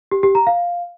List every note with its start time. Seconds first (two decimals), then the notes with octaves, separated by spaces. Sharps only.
0.11 G4
0.23 G4
0.35 A#5
0.47 F5